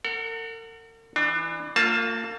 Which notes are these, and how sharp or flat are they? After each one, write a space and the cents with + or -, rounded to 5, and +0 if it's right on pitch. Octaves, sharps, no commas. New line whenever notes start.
A#4 -45 F#5 +0
E3 +0 D4 +35
A#3 -40 F4 +15 A5 +0